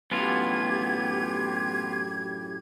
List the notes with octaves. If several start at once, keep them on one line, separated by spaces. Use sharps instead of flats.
F#2 A2 B3 F4 G4 G#6